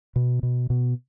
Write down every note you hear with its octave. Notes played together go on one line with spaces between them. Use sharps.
B2
B2
B2